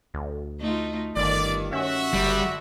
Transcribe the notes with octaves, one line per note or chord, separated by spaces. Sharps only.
D2
A3 D#4 F4
G1 G2 D#3 D5
C#4 F#4 E5
F#1 D3 G3